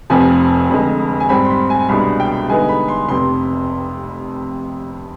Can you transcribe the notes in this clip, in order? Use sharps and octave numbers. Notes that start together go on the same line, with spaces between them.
F1 F2 C3 F3 C4 G#5
F1 F2 D3 G#3
G#5
G#2 G3 C4 B5
C6
B5
G#5
C2 B2 G#3 D4 B5
G5
G2 D3 G#3 B3 D#4 G#5
B5
C6
F1 F2 C3 C6